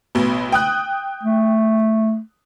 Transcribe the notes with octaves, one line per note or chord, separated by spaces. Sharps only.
A1 B2
G5 D#6 F#6
A3